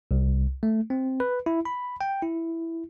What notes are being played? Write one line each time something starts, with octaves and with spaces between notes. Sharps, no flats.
C2
A3
C4
B4
E4
B5
G5
E4